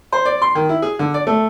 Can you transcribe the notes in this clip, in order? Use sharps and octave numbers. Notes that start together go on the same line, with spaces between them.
C5
D5
C6
D#3
E4
G#4
D3
D5
A3